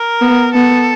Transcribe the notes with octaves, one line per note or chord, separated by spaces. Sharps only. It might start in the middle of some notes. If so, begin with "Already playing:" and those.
Already playing: A#4
B3
B3 A4